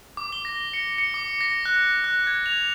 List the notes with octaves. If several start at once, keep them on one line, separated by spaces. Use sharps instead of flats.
D6
G7
A#6
C#7
C#7
D6
A#6
F#6
F#6
G#6
F7